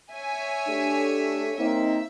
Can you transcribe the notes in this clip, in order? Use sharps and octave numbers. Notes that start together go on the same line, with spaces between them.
C#5 E5 G#5
A3 D4 G4
A#3 C4 D#4 E5